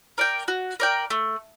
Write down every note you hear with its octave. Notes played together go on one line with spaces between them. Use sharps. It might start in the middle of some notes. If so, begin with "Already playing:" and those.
A#4 D5 G5
F#4
A#4 D5 G5
A3